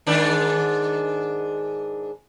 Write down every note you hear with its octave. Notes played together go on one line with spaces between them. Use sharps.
G#2 D#3 D4